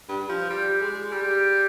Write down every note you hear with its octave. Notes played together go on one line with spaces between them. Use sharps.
G2
F3
G3
G#3
G3